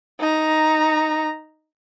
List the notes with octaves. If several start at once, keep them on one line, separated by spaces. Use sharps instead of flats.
D#4 A#5